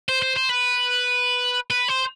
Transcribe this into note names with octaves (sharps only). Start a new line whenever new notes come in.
C5
C5
C5
B4
B4
C5